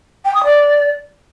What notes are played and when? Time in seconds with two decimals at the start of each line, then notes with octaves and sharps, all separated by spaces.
0.25 G5
0.35 D#6
0.44 D5